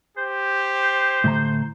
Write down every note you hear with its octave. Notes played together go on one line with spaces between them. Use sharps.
G4 C5
A2 D3 A#5